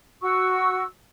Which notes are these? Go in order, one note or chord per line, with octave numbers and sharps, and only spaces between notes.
F#4 C#6 E6